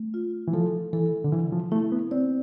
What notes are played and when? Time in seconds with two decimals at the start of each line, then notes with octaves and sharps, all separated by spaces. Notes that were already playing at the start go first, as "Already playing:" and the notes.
Already playing: A3
0.14 F4
0.48 E3
0.53 F3 A4
0.93 E3 A4
1.24 D3
1.32 C3 E3
1.52 F3
1.72 A3 E4
1.92 B3
2.11 C4 D5